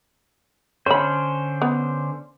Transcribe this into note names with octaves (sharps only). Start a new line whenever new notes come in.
D3 C#4 C5 C#5 B5
B3